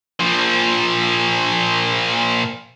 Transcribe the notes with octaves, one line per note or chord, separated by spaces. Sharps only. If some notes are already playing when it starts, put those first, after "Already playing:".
A#2 F3